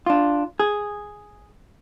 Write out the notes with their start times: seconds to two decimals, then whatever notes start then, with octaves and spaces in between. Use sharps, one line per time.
0.06 D4 F4
0.59 G#4